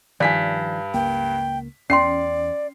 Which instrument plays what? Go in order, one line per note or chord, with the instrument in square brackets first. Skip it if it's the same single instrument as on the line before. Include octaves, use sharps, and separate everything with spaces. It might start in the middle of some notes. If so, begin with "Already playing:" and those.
[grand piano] G2 B6 [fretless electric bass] D#3 F3 [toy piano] D5 G#5
[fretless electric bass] C#2 A#3 [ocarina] G5
[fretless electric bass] E2 [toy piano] C#4 G5 C6 [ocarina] D5 [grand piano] C7